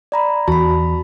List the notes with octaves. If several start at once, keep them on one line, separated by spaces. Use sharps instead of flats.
D5 A#5 B5
E2 F#4 A5 B5